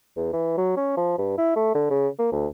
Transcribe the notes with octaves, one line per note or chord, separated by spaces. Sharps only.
E2
E3
F#3
C#4
F3
G2
E4
A3
D3
C#3
A#3
D2